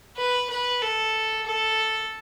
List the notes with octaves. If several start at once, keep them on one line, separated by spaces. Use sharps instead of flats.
B4
B4
A4
A4